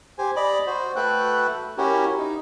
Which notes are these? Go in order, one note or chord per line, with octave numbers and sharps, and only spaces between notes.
G4 C5 G#5
D5 D#5 B5 D6
F#4 C5
A3 F#4 A4 B4 G5 F#6
C#4 E4 F#4 G4 A#4
D#4